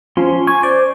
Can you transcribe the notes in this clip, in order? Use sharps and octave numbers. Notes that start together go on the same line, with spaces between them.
F3 C#4 C6
G#5 C#6
C5 D5